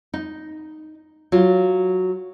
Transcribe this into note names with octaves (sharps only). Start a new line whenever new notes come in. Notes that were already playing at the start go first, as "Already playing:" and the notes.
D#4
F#3 F4